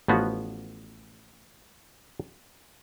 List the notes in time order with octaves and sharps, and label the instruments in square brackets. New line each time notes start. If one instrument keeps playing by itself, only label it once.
[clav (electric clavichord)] A1 F3 B3 F#4